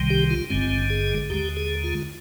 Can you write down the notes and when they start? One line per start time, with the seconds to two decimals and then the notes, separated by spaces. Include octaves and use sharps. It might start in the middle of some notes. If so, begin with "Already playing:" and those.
Already playing: C2 C3 D#3 G3
0.10 G4
0.30 F4
0.50 G#1 G2 D3 G#3 C4
0.90 G#4
1.30 D#2 D3 G#3 G4
1.57 G#4
1.84 F4